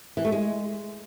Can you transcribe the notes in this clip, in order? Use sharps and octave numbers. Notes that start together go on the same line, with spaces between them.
E3
A3
G#3